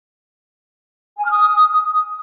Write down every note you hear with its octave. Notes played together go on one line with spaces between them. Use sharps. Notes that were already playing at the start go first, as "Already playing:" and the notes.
G#5
F6
D#6